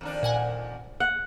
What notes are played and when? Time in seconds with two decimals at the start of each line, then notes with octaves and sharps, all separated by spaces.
0.01 F2 D#3 D4
0.23 A#2 F#5 G#5
1.00 F#5